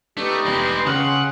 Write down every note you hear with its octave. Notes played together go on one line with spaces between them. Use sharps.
A3 D4 D#4 G4 B4 B6
F1 G#3 C4 D5 B5
C#3 F#5 G5 C6 F6